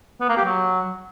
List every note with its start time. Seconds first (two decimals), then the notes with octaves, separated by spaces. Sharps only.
0.21 B3
0.29 A#3
0.37 G4
0.45 F#3